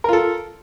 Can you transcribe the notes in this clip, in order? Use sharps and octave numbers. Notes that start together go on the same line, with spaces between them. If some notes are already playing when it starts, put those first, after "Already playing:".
F4 A4 A#4